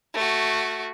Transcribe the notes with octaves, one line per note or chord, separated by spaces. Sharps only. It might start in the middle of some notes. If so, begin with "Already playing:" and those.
A3 F#4